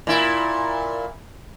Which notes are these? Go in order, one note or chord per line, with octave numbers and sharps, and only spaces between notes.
A#2 E4